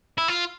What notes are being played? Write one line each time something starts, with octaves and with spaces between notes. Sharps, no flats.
E4
F4